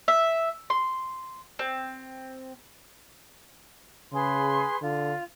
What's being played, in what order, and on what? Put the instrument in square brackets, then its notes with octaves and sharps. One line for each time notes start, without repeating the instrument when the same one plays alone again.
[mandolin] E5
C6
C4
[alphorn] C#3 [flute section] G#4 B4 C6
[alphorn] D3 [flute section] F4